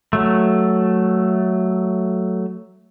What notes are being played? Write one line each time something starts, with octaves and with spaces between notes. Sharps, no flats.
F#3 A3